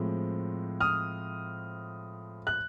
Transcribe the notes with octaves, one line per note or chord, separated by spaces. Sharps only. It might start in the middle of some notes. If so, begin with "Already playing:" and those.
Already playing: A2 F3 G#3 C4
D#6 F6
F#6